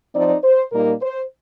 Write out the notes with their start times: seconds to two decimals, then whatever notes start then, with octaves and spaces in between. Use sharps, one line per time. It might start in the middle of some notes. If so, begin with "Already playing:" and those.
0.14 F3 C4 D#4 D5
0.44 C5
0.72 A#2 G3 A#3 D#4 A#4
1.01 C5